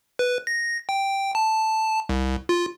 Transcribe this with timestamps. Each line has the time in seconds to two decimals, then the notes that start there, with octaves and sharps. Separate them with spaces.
0.19 B4
0.47 A#6
0.89 G5
1.35 A5
2.09 C2
2.49 F4